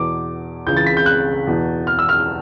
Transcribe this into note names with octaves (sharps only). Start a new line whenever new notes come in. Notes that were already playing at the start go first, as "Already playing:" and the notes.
Already playing: E2 B2 D6
C#2 C#3 E3 G6
A6
B6
G6
F#6
E2 B2
F6
E6
F6